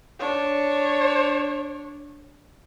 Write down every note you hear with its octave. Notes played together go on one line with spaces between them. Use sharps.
D4 C#5